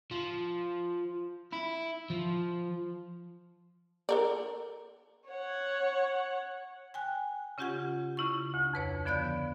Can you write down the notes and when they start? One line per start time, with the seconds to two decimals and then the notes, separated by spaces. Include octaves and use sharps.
0.11 F3
1.52 E4
2.10 F3
4.09 A4 A#4 D5
5.30 C#5 F#5
6.94 G5 G#5 F#6
7.58 C#3 C#4 F4 G4 F#5 G#6
8.17 C#3 E4 C#6
8.54 D2
8.73 F2 B4 C#5
9.05 D3 F3 B3 D5 F#6 G6